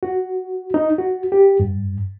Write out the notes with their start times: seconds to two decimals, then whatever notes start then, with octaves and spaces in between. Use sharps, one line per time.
0.03 F#4
0.74 D#4
0.98 F#4
1.32 G4
1.60 G2